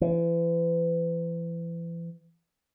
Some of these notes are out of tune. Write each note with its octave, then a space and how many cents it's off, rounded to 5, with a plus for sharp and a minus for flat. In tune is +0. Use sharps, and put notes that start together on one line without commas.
E3 +35